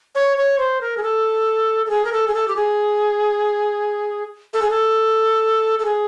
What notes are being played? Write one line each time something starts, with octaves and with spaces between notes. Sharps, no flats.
C#5
C#5
C5
A#4
G#4
A4
A4
G#4
A#4
A4
G#4
A4
G4
G#4
A4
G#4
A4
A4
G#4